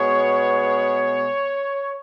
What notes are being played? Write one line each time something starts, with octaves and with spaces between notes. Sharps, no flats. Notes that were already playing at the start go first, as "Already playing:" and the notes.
Already playing: B2 G#3 B3 C#5